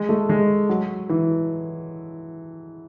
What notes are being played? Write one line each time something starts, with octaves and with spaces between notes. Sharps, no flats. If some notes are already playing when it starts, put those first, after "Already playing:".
Already playing: G#3
A3
G#3
F#3
E3